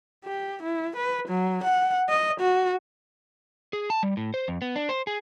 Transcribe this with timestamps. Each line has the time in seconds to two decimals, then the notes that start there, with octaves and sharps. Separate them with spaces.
0.24 G4
0.63 E4
0.96 B4
1.28 F#3
1.64 F#5
2.09 D#5
2.40 F#4
3.73 G#4
3.90 A5
4.03 G3
4.17 A2
4.34 C5
4.48 F2
4.62 B3
4.76 D4
4.89 C5
5.07 G#4